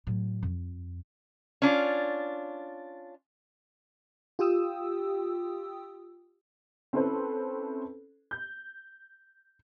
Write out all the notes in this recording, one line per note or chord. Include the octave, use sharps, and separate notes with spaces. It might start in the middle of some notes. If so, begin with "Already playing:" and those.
A2 F#3
F2
C#4 D4 F4
F4 G4 G5 D#6 E6
C4 C#4 E4 A4 B4 C5
G6